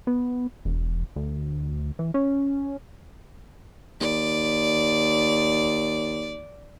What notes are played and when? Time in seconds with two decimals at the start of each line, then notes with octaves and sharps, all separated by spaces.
0.07 B3
0.65 E1
1.16 D2
1.99 E3
2.14 C#4
4.01 D#2 D5